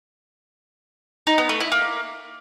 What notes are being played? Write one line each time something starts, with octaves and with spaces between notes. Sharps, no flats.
D#4
B3
A3
E4
A#3